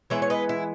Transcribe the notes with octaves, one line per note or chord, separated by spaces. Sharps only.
E3 G#3 B3 C#5 E5
C#5
B4 D#5
E4